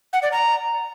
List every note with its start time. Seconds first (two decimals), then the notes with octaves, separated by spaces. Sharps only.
0.13 F#5
0.23 D5
0.32 A#5